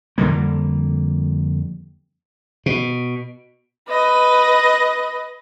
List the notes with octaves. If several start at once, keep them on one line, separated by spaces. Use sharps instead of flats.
F2 D3 G3 A#3
B2
B4 D#5